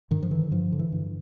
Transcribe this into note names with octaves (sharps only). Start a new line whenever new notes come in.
G2 D#3
F3
D3 E3
G2 F3
D3
E3
G2